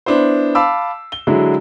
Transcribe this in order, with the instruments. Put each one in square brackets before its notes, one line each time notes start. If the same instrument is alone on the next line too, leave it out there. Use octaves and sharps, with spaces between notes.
[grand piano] B3 D4 E4 C5
F5 A5 B5 D6 E6
G7
D3 F#3 G#3 E4